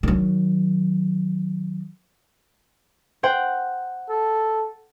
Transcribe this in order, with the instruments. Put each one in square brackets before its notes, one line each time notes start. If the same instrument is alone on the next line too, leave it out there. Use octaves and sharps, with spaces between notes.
[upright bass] D#3 F#3
[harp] C5 F#5 G5
[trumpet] A4